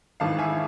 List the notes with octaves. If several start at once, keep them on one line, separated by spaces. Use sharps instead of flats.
G#1 G#2 E3 F5 A5
E5 G#5